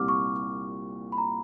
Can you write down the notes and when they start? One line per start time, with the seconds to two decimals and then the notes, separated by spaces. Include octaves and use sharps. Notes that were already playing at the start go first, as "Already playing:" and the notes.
Already playing: C2 A#2 G3 C4 D6 F6
0.08 C#6
1.12 B5
1.18 A#5